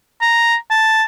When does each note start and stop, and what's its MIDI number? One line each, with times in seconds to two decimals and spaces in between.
0.21 0.55 82
0.71 1.04 81